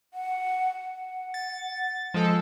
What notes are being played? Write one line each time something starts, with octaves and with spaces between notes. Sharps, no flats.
F#5
F#5
A6
F3 G#3 A4